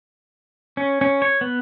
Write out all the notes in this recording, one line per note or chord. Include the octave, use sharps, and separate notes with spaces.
C#4
C#4
C#5
B3